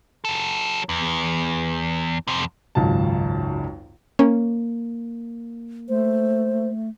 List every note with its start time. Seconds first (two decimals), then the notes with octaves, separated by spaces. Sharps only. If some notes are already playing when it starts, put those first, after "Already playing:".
0.25 F#3 A4
0.89 E2
2.27 F2 C3
2.75 G#1 C#2 F#2 A5
4.19 A#3 C#4
5.89 A3 C5